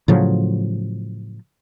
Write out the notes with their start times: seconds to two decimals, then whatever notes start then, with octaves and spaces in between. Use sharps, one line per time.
0.08 A2 C#3 F3 F#3